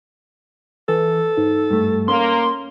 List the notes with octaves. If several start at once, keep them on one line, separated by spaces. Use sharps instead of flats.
E3 A4
G#2
G2 A3
A#3 C#4 C6